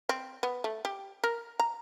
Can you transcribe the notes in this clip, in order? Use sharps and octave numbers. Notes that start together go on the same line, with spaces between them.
C4
B3
A3
G4
A#4
A#5